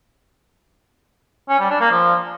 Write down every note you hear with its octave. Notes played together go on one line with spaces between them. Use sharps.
C#4
G3
D4
A#3
F3